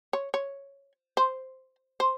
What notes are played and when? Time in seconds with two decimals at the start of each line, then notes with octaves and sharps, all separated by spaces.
0.13 C#5
0.34 C#5
1.17 C5
2.00 C5